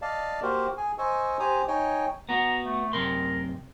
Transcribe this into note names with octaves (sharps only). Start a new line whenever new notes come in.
D5 D#5 F5 A5
A#3 F#4 G4 A#4 C5
G#4 G#5
C5 D#5 G#5 C#6 E6
G4 C5 G#5 A#5 D#6
D#4 C#5 D#5 G5 G#5
B3 F#4 A#5
A3
F#2 C3 A#4 C6